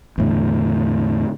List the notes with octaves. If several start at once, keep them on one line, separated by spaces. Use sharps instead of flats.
E2 A2 D3